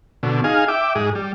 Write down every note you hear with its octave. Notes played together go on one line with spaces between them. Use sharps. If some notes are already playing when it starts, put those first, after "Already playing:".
B2 D3
D#4 G#4 F5 G#5
E5 G5 D6
G#2 G#4
G3